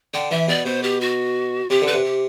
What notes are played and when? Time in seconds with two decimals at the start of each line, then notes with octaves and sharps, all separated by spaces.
0.14 D3 G5
0.31 E3 E5
0.48 B2 D5
0.66 B2 C5
0.83 G4
1.01 F#4
1.70 C3 G4
1.82 D3
1.87 B4
1.93 C3
2.05 G4